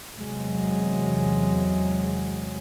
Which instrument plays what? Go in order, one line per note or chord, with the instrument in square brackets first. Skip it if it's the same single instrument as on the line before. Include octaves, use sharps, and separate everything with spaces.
[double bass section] E2 C3 F#3 G#3